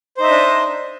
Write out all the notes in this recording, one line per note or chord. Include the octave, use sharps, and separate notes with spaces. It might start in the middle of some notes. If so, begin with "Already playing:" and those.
D4 D#4 C5 D#5 E5